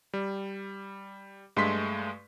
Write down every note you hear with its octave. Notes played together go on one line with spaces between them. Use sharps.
G3
G2 G#3 A3 C6 B6